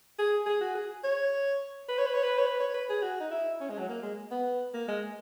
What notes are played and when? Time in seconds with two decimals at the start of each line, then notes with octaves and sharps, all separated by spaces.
0.19 G#4
0.46 G#4
0.61 F#4
0.75 G#4
1.04 C#5
1.89 B4
1.98 C#5
2.07 B4
2.14 C#5
2.23 B4
2.38 C#5
2.46 B4
2.60 C#5
2.74 B4
2.89 G#4
3.02 F#4
3.20 D#4
3.31 E4
3.61 C#4
3.70 G#3
3.78 F#3
3.89 A#3
4.02 G#3
4.31 B3
4.74 A#3
4.88 G#3